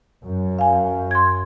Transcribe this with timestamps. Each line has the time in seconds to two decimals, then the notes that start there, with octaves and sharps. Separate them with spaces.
0.24 F#2
0.59 F5 G#5
1.11 C6 G#6